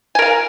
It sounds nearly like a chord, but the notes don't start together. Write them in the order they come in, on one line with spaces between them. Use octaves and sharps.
G#5 A#4 F5